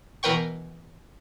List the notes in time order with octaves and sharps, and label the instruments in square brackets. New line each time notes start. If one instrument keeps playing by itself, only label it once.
[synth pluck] B2 E3 A#4 B4 G5 C#6